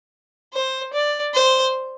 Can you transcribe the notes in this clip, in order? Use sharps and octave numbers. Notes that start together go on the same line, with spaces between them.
C5
D5
C5